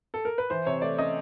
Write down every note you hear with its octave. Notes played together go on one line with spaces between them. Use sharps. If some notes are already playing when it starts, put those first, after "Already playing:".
A4
A#4
B4
E3 C5
C3 C#5
A3 D5
C#4 D#5